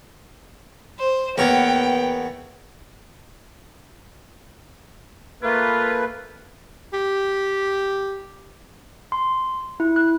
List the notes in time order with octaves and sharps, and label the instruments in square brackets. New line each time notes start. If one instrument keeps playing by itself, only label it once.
[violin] C5
[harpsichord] E2 C#5 [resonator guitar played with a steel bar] A#3 B3 [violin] G5
[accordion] A3 A#3 B4 [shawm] F4
[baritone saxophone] G4
[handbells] C6
E4
F#6